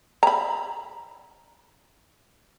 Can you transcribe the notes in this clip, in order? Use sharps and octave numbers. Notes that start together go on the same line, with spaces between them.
A#5 B5